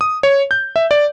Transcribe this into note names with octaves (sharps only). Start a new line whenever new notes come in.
D#6
C#5
G6
E5
D5